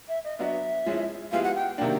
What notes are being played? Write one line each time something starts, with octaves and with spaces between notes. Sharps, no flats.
E5
D#5
F#3 B3 D4 F#4 E5 F5
F3 G#3 C#4 E4
F3 G#3 B3 E4 G4 F5
F#5
G5
C3 D#3 F#3 A#3 D4 G5